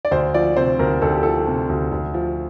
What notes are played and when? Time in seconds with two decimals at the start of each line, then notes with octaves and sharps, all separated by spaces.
0.05 D5
0.11 D2 C5
0.34 F3 D5
0.57 C3 C5
0.79 D2 A#4
1.01 D2 A4
1.12 G4
1.23 F3 A4
1.47 C3
1.69 D2
1.92 D2
2.14 F3